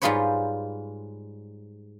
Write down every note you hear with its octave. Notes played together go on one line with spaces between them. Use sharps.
G#2 G3 F4 G#4 B4 C#5